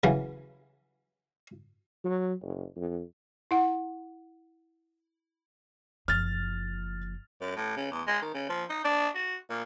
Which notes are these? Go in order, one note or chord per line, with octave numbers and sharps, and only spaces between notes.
C#3 E3 F#3
F#3
F#1
F2
E4 F#5
F#1 F3 F6 A6
F#2
A2
C#3
E2
G#3
D#3
C#3
F3
D#4
D4
F#4
A#2